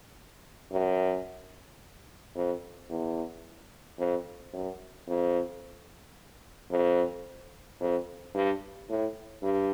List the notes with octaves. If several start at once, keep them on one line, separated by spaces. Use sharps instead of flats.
F#2
F2
E2
F2
F#2
F2
F2
F2
G2
A2
G2